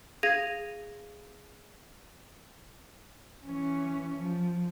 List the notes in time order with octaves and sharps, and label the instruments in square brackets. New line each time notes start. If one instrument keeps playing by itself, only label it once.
[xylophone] G#4 F5 G#6 A#6 D#7 F7
[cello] E3 C#4
F3